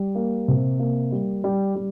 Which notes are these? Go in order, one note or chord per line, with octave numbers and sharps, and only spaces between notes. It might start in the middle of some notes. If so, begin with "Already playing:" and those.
Already playing: G3
A#3
C3
A#3
G3
G3
G3